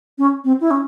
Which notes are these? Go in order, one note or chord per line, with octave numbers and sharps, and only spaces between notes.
C#4
C4
E4
C#4